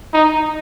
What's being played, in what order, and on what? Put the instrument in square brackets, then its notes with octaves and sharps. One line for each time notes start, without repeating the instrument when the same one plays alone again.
[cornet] D#4